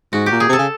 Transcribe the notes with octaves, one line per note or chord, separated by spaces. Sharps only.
G#2 F#4
A#2 G4
G#4
C3 A4
C#3